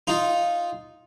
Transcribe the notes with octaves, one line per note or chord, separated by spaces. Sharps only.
D#4 F4